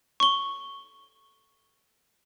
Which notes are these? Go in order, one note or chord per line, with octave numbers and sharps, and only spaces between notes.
C#6 G7